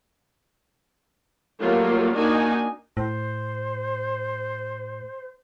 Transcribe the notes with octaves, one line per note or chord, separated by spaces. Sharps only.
F#3 G3 A3 A#3 F4
A#3 D4 D#4 F#4 G#5
A2 C5